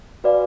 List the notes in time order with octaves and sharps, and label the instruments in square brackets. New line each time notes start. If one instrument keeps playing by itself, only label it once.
[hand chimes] F#4 B4 D5 F5 G#5